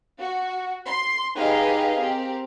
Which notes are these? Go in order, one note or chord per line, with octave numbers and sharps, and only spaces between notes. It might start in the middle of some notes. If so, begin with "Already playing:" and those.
F#4
C6
D#4 G4 G#4 B4 D#5 F5
C4 G4 A#4